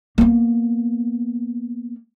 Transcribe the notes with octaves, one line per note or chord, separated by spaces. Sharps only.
A#3 B3